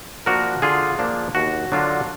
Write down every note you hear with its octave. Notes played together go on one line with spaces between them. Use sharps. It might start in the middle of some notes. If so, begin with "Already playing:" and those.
F3 A#3 D4 F#4 A#4
D3 F4 G#4
F3 A#3 D4 F4
D#2 F#4
D3 F#3 D4 F4